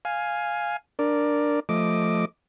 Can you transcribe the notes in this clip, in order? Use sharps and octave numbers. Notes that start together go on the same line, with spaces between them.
F5 G#5
D4 A#4 D5
F3 A3 D#5 D6